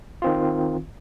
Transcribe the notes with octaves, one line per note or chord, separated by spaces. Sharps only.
D#3 C4 F4